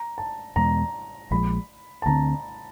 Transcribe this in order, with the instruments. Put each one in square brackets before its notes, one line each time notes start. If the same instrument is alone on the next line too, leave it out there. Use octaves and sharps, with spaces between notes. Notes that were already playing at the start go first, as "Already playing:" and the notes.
Already playing: [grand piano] A#5
A5
[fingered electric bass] E2 B2 G#3 B3 [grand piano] A#5
[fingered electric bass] A#1 A#2 F3 G#3 [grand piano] B5
[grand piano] A5
[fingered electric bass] D2 D3 G3 C4 [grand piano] A#5